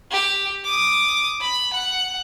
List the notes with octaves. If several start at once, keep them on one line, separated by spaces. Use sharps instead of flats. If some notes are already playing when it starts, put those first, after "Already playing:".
G4
D6 D#6
B5
F#5